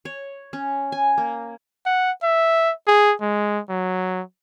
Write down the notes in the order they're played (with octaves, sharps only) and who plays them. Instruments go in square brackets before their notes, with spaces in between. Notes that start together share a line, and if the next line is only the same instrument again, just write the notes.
[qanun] C#5
C#4
G#5
A#3
[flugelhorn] F#5
E5
G#4
G#3
F#3